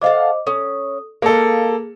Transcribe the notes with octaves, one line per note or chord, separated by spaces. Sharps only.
A4 C5 D#5 F5 F#5 D6
C#4 A4 D#6
G#3 A#3 G#4 A4 F5